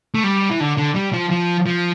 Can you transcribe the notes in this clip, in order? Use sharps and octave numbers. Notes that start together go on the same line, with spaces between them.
A3
G3
E3
D3
D3
G3
F3
F3
F3